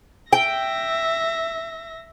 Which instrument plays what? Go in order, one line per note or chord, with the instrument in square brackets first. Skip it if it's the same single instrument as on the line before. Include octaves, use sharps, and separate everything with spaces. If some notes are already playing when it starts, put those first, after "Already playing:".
[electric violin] E5 A#6 [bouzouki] G5